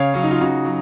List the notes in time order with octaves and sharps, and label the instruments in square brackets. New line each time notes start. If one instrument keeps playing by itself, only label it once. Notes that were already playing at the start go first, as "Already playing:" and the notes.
Already playing: [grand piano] C#3 C#5 F5
F#3 C#4
D#4
F4
C#3 D#4 F#4
F#3